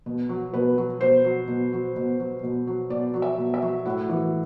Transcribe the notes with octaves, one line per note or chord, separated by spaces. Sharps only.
B2
F#3
B2 B4
F#3
B2 C5
F#3
B2
F#3
B2
F#3
B2
F#3
B2 D5
F#3
E5
B2
E5
F#3
A2 F#5
E3